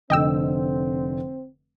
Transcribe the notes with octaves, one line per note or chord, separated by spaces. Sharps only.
F1 D3 C4 D#5 G5 E6